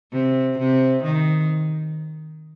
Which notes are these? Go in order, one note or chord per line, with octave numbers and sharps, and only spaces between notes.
C3
C3
D#3